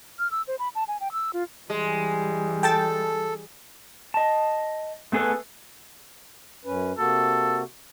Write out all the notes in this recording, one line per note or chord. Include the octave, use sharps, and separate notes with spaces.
F6
E6
C5
B5
A5
G#5
G5
E6
F4
E3 G3 G#3
A4 G5 A5 A6
D#5 A5
A3 B3 G#4 A4 B4
F#2 C#4 B4
C3 A#3 F#4 A4